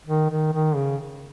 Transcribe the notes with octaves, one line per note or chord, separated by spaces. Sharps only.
D#3
D#3
D#3
C#3